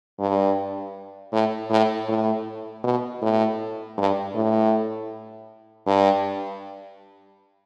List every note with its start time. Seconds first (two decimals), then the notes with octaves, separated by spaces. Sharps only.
0.19 G2
1.32 A2
1.70 A2
2.08 A2
2.84 B2
3.22 A2
3.98 G2
4.35 A2
5.87 G2